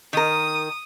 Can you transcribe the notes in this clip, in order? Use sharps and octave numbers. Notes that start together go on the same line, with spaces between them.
D#3 A#4 D#6